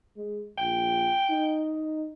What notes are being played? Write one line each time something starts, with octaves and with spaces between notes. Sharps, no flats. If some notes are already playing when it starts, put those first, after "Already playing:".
G#3
A#1 G5
D#4